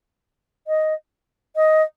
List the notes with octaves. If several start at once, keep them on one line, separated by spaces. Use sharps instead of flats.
D#5
D#5